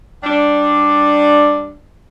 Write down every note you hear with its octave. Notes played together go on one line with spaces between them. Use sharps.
G3 D4